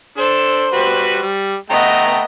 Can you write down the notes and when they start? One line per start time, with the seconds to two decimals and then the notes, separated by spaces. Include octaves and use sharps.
0.17 D4 A4 C5
0.73 G3 F#4 B4
1.22 G3
1.70 A3 B3 D#5 G5 A#5